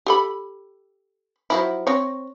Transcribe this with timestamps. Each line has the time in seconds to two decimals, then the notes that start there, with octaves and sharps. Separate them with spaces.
0.06 G4 A4 B5
1.50 F3 F#3 E4
1.87 C4 C#5